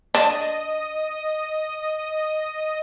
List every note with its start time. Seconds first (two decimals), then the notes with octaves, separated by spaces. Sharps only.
0.15 D4 D#5